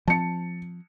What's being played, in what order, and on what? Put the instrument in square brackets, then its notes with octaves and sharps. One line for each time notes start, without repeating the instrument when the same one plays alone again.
[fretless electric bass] F3 C4 [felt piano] A5 C#7